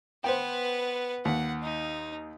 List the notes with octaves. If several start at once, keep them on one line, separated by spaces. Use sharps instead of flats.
B3 B4 C5 G5
D#2 F#5
D#4